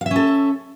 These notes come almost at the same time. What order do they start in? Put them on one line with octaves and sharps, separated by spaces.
F5 E5 C#4 A4